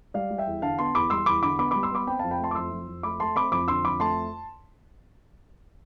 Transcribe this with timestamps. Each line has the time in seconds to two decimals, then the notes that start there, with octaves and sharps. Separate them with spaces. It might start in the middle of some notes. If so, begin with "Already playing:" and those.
0.14 G3 D5 F5
0.31 G3
0.38 E5 G5
0.46 E2
0.62 D3 F5 A5
0.78 B3 A5 C6
0.95 E2 B5 D6
1.10 G3 C6 E6
1.26 E2 B5 D6
1.42 D3 B5 D6
1.59 B3 B5 D6
1.71 G3 B5 D6
1.83 C6 E6
1.91 B3 B5 D6
2.07 C4 G5 B5
2.19 F2 F5 A5
2.31 G5 B5
2.39 A3 A5 C6
2.51 D6
2.55 F2 C6 E6
2.71 F2
2.88 F2
3.03 A3 B5 D6
3.20 A3 A5 C6
3.36 C4 B5 D6
3.52 F2 B5 D6
3.68 D3 C6 E6
3.85 F2 B5 D6
4.00 A3 A5 C6